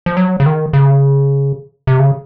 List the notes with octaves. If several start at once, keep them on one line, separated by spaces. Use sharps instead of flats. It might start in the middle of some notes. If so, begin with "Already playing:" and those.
F3
F#3
C#3
D#3
C#3
C3
C#3